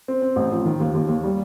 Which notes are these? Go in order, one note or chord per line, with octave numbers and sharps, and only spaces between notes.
C4
C4
A1
F3
D#3
D#2
D#2
D#2
G3